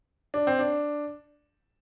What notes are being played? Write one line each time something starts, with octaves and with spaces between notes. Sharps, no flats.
D4
C4
D4